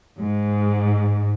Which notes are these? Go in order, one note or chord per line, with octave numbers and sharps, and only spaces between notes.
G#2